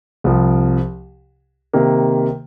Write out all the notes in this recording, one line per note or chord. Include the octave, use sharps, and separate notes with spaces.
C2 C3 F3
C3 D#3 A#3